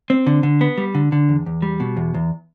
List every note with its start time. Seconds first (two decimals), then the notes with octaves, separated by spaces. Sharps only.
0.10 C4
0.27 D3
0.43 D3
0.61 B3
0.78 G3
0.95 D3
1.12 D3
1.29 E2
1.46 E2
1.62 G3
1.80 B2
1.97 E2
2.14 E2